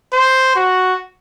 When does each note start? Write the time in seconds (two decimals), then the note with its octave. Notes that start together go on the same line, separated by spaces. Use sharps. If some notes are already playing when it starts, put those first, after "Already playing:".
0.13 C5
0.56 F#4